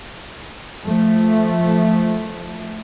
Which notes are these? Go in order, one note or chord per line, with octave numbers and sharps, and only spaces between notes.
F3 A3